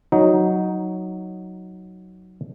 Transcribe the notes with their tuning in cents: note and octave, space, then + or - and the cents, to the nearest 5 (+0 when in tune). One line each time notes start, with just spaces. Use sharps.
F#3 +0 D#4 +5